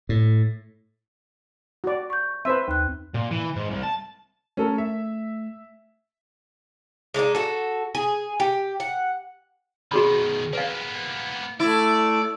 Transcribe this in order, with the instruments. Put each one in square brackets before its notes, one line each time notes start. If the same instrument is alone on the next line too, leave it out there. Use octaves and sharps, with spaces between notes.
[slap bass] A2
[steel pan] F#4 D5
[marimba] C#6 G6
[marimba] C4 [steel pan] B4 C5 E5
[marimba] D#2 F#6
[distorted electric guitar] A#2
E3
G#2
C2
A5
[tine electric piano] A3 [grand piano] C#4 A4 A#4
[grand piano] E5
[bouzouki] G#3 A3 D4 D#4
F#4 A4
G#4
G4
F#5
[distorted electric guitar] B2 D#3 [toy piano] F#4 G#4 B5
[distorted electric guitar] A#3 B3 [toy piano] B4 F5
[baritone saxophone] A3 [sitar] E4 [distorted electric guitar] D5